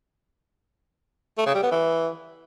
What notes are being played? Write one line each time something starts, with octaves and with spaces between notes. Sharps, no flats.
A3
C#3
G3
B3
E3